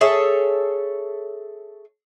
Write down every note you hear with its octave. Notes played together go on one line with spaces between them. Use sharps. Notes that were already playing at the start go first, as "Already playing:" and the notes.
G#4 A4 C#5 E5